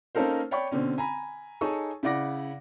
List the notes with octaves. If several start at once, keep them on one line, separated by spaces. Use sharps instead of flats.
A#3 C#4 D#4 A4 A#4 C5
C#5 D5 G5 B5 C#6
B2 D3 C4 C#4
G#5 A#5 B5
D#4 G#4 A4 C#5 G#5 C#6
C#3 E4 D5 F#5 D6 A#6